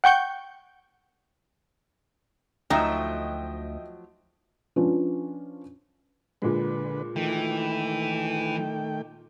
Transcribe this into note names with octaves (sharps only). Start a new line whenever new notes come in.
F#5 G5 C#6 G6
D2 F3 F#3 A3 D#4 D#5 E5 G5
F3 C#4 D4 F4 B4
A#2 D3 G#3 B4
D#3 E3 A3 G5